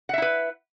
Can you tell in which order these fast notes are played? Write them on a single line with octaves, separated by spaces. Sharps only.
F#5 E5 E4 B4